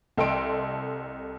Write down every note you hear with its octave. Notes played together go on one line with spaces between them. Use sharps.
C2 A4 D#5 G5 C6 D7